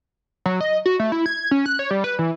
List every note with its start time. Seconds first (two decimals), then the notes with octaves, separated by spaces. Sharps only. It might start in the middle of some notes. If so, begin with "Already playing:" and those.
0.46 F#3
0.61 D#5
0.86 F#4
0.99 A3
1.12 E4
1.26 G#6
1.51 C#4
1.66 F#6
1.79 C#5
1.91 G3
2.04 B4
2.19 E3